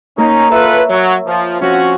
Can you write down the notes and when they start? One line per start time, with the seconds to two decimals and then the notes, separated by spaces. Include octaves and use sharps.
0.18 A#3 C#4 D#4 A#4
0.51 F4 A4 B4 C#5 E5
0.89 F#3
1.27 F3
1.61 F3 C4 C#4 F#4